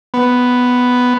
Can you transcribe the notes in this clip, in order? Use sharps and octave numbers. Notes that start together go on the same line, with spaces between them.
B3